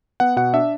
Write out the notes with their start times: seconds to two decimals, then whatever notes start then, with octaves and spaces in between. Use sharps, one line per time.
0.20 B3 F#5
0.36 B2 F#5
0.53 D4 E5